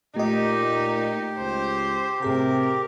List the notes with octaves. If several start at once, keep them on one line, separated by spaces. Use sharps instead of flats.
A#2 A3 D#4 G4 D#5
C#2 C5
A2 C3 G#4 A#4 G5